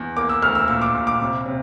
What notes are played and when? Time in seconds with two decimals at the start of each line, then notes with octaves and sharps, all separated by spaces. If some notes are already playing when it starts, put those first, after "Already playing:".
Already playing: E2
0.17 A#3 D6
0.29 E6
0.42 D2 F6
0.55 E6
0.68 A#2 E6
0.82 D6
0.94 A#2
1.07 D6
1.21 C3
1.46 C3